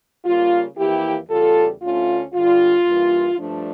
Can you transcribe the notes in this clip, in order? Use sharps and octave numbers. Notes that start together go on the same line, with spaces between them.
C#3 G3 A#3 F4
F2 E3 A#3 E4 G4
E2 C#3 G3 F4 A4
D2 D3 A3 C#4 F4
G2 D3 G3 F4
G2 E3 G3 A#3
G2 F3 A3 D4